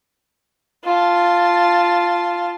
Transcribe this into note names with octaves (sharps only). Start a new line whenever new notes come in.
F4 A5